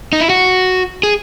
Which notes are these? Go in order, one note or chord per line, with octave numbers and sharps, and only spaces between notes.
D#4
E4
F#4
G#4